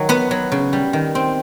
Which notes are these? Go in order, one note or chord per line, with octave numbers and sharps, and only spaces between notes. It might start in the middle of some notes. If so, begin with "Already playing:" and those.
Already playing: D#3 F#3
B3 B4
F#3
C#3
G3
D#3
C4